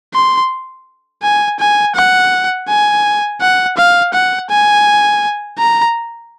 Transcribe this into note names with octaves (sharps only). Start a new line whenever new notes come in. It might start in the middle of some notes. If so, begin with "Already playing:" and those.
C6
G#5
G#5
F#5
G#5
F#5
F5
F#5
G#5
A#5